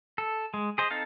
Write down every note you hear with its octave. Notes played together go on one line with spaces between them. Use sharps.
A4
G#3
G#4 C5 D#5
C4 D#4 A4 F5